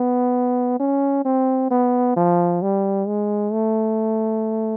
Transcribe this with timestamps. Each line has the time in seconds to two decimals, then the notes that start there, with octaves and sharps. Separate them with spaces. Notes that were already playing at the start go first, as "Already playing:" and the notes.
Already playing: B3
0.80 C#4
1.25 C4
1.71 B3
2.16 F3
2.62 G3
3.07 G#3
3.53 A3